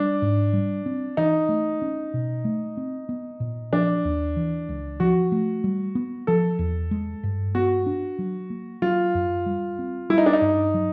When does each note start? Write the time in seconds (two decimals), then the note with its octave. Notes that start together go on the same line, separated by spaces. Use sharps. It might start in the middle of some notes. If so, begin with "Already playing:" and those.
Already playing: G3 D4
0.22 G#2
0.53 G3
0.86 C4
1.17 E3 D#4
1.49 A3
1.82 C#4
2.14 B2
2.45 A3
2.77 C4
3.09 B3
3.40 A#2
3.73 F3 D4
4.05 D#2
4.36 E3
4.69 C#2
5.00 F3 F#4
5.32 A3
5.64 G3
5.95 B3
6.27 F3 A4
6.59 E2
6.91 G#3
7.23 G2
7.55 B3 F#4
7.86 D4
8.19 F#3
8.50 A#3
8.82 F#3 F4
9.14 F#2
9.46 G3
9.79 C4
10.10 G3 E4
10.18 D#4
10.26 D4
10.33 D#4
10.42 G2
10.74 F#3